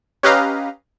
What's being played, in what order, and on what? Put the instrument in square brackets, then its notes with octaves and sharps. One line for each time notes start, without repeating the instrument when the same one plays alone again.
[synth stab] C#4 G4 B4 D#5 F5 A#5